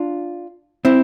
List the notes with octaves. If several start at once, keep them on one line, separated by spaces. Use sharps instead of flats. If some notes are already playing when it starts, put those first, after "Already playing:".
Already playing: D4 F4
C4 E4